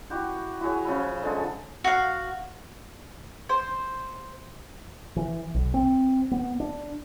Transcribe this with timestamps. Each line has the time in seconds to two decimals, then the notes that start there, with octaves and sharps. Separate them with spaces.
0.10 E4 F#4 G4
0.61 E4 F#4 G#4 C#5
0.85 C#3 F3 E5 B5
1.23 D3 G#3 A4
1.84 F#4 F5
3.49 C5
5.16 E3
5.54 B1
5.74 C4
6.31 B3
6.60 D4